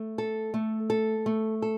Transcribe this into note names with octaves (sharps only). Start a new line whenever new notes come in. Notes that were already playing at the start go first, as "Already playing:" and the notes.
Already playing: A3
A4
A3
A4
A3
A4